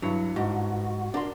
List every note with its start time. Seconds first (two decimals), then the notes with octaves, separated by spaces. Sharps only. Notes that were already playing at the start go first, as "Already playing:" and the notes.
0.02 G2 F#3 E4 C#7
0.36 G#2 F#4
1.14 D4 A#4 C6